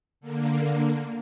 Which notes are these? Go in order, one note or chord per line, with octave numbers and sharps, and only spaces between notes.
D3 A#3